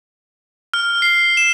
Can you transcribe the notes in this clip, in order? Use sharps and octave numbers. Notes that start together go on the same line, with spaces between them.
F6
C7
E7